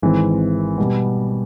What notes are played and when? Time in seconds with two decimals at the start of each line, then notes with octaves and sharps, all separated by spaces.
0.02 G#1 G#2 E3 G#3 C4
0.78 B2 G3 B3